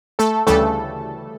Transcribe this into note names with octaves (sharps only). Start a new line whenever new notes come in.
A3 A4
D2 C#3 E3 G3 A3 A4